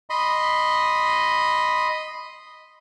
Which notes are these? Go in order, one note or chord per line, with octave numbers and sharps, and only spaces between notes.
D#5 B5 C6